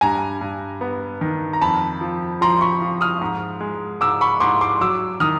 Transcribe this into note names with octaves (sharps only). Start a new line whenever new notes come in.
G2 G#5 A#5
G2
B3
D#3
A#5
F2 A5 B5
F3
F3 A#5 C6
B5 C#6
F3
D#6 F6
G#2
G#3
G#2 D6 E6
B5 C#6
G#2 C6 D6
C6 D6
F#3 D6 E6
D#3 D#6 F6